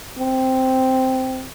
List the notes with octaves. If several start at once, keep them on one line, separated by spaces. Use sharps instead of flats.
C4